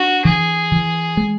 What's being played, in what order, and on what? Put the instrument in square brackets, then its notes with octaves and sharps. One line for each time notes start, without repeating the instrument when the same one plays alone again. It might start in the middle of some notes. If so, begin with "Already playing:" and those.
Already playing: [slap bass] D4 [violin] F#4
[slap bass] E3 [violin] G#4
[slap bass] E3
G#3